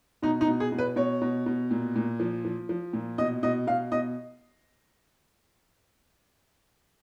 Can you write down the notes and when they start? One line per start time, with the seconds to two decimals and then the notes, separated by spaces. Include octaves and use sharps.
0.22 B2 D#4
0.41 D#4
0.48 B2
0.60 G#4
0.72 B2
0.78 B4
0.96 B2 C#5
1.21 B2
1.46 B2
1.71 A#2
1.96 A#2
2.20 F3
2.45 F3
2.69 F3
2.93 A#2
3.18 B2 D#5
3.43 B2 D#5
3.67 B2 F5
3.92 B2 D#5